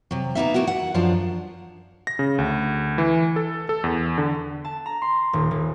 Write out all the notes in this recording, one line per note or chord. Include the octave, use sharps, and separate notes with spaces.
C3 F#3
A#3 B3 D4 D#4 F#4 E5
A3 A#3 E4 F#4
F#5
F#2 F3 F#3 D4 F4
A#6
C#3
D2
E3
A4
A4
E2
D3
A5
A#5
C6
D#1
D#1